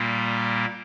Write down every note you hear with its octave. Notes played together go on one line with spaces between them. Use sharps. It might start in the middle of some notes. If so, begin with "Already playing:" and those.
Already playing: A#2 G3 A#3